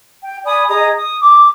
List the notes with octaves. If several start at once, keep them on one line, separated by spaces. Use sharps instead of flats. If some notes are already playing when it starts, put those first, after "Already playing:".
G5
D5 G#5 B5 D#6
G#4 D#5 A#5 D#6
D#6
D6